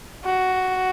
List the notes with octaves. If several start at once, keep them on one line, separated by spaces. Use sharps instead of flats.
F#4